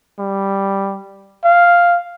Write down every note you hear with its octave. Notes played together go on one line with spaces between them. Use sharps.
G3
F5